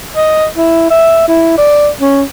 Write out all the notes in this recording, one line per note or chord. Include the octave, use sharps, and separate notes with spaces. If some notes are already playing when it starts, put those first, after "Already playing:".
D#5
E4
E5
E4
D5
C#4